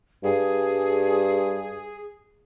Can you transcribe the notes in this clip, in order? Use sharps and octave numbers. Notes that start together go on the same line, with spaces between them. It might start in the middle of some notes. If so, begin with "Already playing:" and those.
G2 G#4